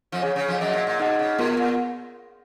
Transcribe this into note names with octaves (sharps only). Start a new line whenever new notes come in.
F2 F3
C#3 G#4 C#5 G#5
C#3
F2 F3
F#2 F#3 G#4 D#5 F#5
A#2
A#2
B2 D#4 G#4 D#5 F#5
C#3
B2 B3 F4 A#4
A#2